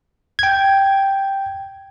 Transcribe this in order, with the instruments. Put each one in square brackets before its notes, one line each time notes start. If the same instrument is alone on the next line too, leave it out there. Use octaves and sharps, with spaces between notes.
[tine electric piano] G5 G#6